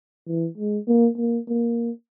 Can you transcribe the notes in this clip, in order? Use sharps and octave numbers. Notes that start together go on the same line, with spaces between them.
E3
G#3
A#3
A#3
A#3